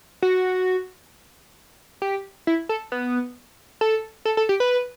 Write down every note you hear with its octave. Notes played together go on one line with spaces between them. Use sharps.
F#4
G4
E4
A4
B3
A4
A4
A4
G4
B4